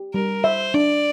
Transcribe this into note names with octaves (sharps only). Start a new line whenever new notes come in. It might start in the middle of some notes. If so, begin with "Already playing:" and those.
Already playing: G4
G3 A#4
C5 E5
D4 D5